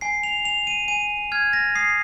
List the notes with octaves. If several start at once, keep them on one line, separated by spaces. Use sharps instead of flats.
G#5 C7
F7
G#5 F7
D#7
G#5 D#7
F6 G#6
A#6
D#6 C7